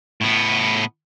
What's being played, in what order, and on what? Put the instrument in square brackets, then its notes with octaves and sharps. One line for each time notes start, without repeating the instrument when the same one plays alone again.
[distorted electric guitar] A2 B3